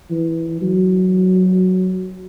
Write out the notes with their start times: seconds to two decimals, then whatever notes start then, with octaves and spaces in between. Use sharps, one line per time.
0.11 E3
0.62 F#3